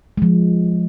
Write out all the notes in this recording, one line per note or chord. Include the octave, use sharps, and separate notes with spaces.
F3 G#3